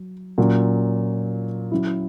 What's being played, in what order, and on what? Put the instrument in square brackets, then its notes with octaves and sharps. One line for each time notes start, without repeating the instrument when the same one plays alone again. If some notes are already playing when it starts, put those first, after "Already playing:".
Already playing: [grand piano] F#3
A#2 F#3 C#4
F#3 C#4 E4